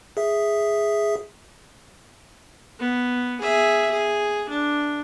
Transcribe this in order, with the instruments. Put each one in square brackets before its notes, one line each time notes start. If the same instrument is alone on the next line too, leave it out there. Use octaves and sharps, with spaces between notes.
[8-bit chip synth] G#4 E5
[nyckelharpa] B3
G#4 E5
G#4
D4